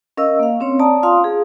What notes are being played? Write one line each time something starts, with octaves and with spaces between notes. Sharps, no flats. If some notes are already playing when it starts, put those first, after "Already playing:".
C#4 A#4 D#5 F5 E6
A#3 F5
C4 C#4 C#5
D5 A5 A#5 D#6
F4 F5 C6 D#6
G#4